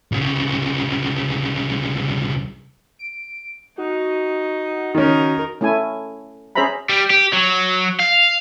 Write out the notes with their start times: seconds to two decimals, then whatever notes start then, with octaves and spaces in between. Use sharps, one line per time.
0.12 C2 C#3
2.99 D7
3.78 D#4 F#4
4.95 D#3 C#4 D#4 A#4
5.61 A3 C#4 E4 A4 G#5
6.55 C#4 G#4 C5 E5 A#5 B5
6.90 G3
7.10 G4
7.33 F#3
7.99 F5